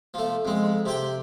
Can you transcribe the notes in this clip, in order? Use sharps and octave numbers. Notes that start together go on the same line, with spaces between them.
F3 A3
F2 G#3
C3 G4 G5